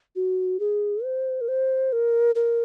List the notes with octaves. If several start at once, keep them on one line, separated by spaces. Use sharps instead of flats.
F#4
G#4
C5
A#4
C5
A#4
A#4